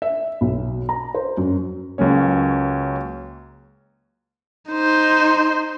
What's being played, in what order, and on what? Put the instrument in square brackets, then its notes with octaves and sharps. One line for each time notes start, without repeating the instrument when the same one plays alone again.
[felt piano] E5
B1
A#5
C5
F#2
[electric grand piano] C#2 F#3 A#3 C#4 C#5
[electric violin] D#4 C5